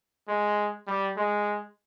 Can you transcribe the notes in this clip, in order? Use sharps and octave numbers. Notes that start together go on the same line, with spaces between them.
G#3
G3
G#3